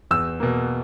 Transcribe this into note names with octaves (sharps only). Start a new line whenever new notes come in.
E2 E6
B2 A#3